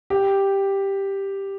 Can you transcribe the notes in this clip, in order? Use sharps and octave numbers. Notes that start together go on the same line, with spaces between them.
G4